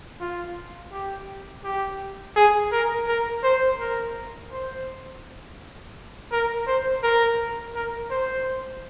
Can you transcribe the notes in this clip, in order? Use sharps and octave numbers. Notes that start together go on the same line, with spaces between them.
F4
G4
G4
G#4
A#4
A#4
C5
A#4
C5
A#4
C5
A#4
A#4
C5